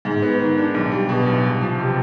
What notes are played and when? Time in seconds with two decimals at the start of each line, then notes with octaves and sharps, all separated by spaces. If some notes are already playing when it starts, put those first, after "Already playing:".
0.05 G#2
0.22 B3
0.40 D#3
0.58 D4
0.74 B1
0.92 G3
1.09 B2
1.26 B1
1.44 C2
1.61 F3
1.78 C3